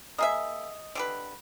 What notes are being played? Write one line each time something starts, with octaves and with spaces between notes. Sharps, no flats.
A#3 G#4 D#5 E5 D#6
D3 G4 B4